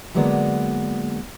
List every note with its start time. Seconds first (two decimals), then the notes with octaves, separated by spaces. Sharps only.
0.14 D3 F#3 G#3 A#3 B3 D5